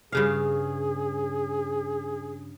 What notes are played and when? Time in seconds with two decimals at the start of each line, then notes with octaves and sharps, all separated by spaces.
0.12 G2 C#3 G#4 F5